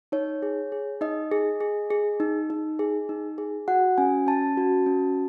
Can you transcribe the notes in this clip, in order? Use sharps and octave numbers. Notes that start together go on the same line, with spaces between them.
D#4 C#5
G#4
G#4
D#4 D#5
G#4
G#4
G#4
D#4
D#4
G#4
D#4
G#4
F#4 F#5
C#4 G#5
C#4 A5
F#4
C#4